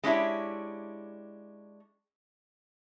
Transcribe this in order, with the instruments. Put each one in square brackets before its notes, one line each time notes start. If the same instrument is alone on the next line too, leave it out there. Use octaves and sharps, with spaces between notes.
[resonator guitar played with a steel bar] G#3 C#4 D4 E4 G4